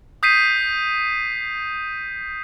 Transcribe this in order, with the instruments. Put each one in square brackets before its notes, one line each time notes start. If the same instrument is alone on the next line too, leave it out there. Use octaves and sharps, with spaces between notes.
[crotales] D#6 G6 B6 C7 D#7